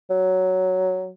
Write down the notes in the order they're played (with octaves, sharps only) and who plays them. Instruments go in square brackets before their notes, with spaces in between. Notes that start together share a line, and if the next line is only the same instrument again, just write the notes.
[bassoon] F#3